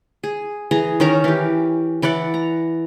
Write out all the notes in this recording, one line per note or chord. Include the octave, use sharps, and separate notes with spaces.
G#4
E3 G#4 A#5
D#3 C#4 A#4 A#5
E3 G4
E3 E4 D5 F#5
A#5